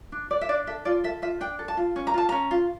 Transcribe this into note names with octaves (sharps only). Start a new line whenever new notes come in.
D4
D4 D5
E5
D4 D5
A4 E5
F4 D5
A4 E5
F4 E5
D4 G5
A4
A5
F4
C#4
A#5
F4 A5
C#4 A#5
F4